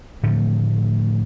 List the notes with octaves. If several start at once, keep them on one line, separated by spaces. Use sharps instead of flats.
A2 D3 F3 A3